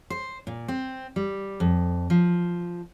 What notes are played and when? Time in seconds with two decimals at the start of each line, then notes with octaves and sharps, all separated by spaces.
0.10 C5
0.47 A#2
0.68 C4
1.16 G3
1.60 F2
2.10 F3